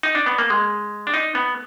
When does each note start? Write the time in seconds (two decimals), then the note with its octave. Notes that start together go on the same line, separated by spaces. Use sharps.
0.03 D#4
0.15 D4
0.26 B3
0.38 A#3
0.50 G#3
1.07 D4
1.14 D#4
1.35 B3